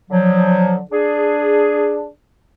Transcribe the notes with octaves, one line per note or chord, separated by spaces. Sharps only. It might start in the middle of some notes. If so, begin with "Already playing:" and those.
D3 F3 F#3
D4 G#4